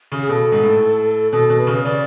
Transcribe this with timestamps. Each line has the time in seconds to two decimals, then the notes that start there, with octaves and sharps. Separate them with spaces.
0.12 C#3
0.20 G#4
0.29 B2 A4
0.52 G#2
0.63 A2
1.32 B2 A4
1.50 B2
1.59 B4
1.67 C#3
1.84 C#3 D5